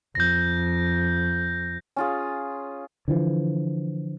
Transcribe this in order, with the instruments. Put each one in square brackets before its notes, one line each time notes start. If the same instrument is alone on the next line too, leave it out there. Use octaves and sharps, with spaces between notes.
[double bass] F2 [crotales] G6 A#6
[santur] C#4 F4 G#4
[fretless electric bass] D3 E3 F3